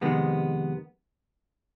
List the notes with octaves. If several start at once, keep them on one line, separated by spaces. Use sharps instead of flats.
F2 C3 D#3 G#3 B3